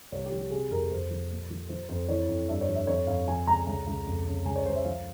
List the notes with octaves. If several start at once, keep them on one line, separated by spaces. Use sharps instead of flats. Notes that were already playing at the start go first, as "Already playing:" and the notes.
C2 C#5
G4
F3
G4
C3 G#4
F2 A#4
F2 C5
F3
A#2
F3
F3 C5
F2 C5
E3 C#5
F2
G2 E5
C#5
F3
E5
F2 C#5
F2 F5
F3 G#5
C#2 A#5
C#2
C#2
F2
C#3
C#2 G#5
C#5
C#2 C5
E5
F3 F5